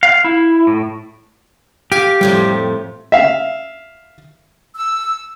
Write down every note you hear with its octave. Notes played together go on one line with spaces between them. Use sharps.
F5
E4
A2
G4 F5 G#5
F2 A2 G3 G5
E5 F5
E6